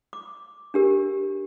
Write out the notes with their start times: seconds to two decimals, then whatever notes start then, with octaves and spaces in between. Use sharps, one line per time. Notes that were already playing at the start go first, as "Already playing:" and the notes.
0.13 D6
0.74 D4 G4 A#4